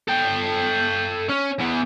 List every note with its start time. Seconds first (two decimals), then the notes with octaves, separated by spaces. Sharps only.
0.08 A4 G5
1.30 C#4
1.60 E2 B3